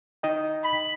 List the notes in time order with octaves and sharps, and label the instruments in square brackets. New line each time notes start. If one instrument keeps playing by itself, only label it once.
[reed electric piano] D#4 D#5 G5
[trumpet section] B5